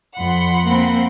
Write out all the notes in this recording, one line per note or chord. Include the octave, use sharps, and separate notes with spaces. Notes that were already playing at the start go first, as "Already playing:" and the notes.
F2 F#5 B5 C6
A#3 C4